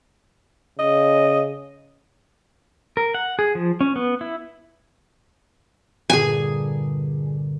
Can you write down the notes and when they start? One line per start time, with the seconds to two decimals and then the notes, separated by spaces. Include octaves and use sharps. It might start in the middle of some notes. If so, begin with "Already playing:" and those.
0.79 C#3 D#5
2.97 A#4
3.14 F#5
3.39 G#4
3.55 F3
3.81 C#4
3.96 B3
4.21 E4
6.10 G2 A#2 D3 G#4 G#5